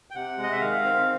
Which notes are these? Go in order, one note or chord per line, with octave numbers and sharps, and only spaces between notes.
G5
C3 F#5
G#3
D#5
E5
D#3 F5
C4